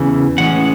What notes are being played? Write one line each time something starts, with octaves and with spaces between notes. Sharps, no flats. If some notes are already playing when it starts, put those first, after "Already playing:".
Already playing: E2 C#3 E3
A2 E3 G#3 C#4 F#5